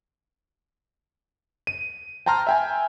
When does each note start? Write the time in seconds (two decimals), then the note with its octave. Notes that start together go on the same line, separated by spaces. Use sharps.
1.67 D#7
2.26 G5 A5 A#5 C6 F6
2.47 E5 G5 G#5